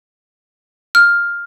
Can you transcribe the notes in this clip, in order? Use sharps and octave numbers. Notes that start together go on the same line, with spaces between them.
F6